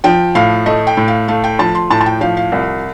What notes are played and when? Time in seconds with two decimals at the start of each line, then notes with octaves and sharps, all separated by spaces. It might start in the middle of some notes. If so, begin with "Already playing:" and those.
0.04 F3 G5
0.35 A2 F5
0.66 A3 D#5
0.87 G5
0.97 A2
1.08 F5
1.28 A3 F5
1.44 G5
1.59 F3 A5
1.75 C6
1.90 A2 A5
2.01 A5
2.06 G5
2.21 F3 F5
2.37 F5
2.52 C2